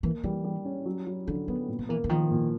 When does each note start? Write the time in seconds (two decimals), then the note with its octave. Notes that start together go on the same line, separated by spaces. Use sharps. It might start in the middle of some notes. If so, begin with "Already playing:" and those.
0.03 E3 A#3
0.24 E3 G3
0.44 G3
0.65 C#4
0.85 F#3
1.07 F#3
1.27 D3 F3
1.48 F#3 B3
1.68 A#2
1.79 F3
1.89 E3 A#3
2.04 D3
2.09 D#3 F3
2.31 A#2